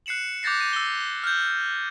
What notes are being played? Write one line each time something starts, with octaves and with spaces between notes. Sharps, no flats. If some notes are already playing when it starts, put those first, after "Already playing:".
F#6 C7 C#7 E7 F#7
D6 F#6 G6 A6 A#6 C7
D6 D#7
E6 G7
F6 G6